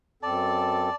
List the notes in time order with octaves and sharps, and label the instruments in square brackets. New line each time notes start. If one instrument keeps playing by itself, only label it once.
[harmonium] F#2 C4 A4 [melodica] D5 A5